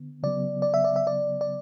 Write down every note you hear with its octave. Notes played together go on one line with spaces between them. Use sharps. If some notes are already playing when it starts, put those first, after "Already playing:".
Already playing: D3 B3
C#3 F#3 B3 D5
D5
E5
D5
E5
D5
D5